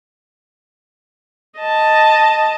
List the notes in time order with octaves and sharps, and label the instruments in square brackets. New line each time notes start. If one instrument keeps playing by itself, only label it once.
[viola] D#5 A5